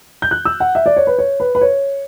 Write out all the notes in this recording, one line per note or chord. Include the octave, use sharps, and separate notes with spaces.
G6
F#6
E6
F#5
E5
D5
C#5
B4
C#5
B4
B4
C#5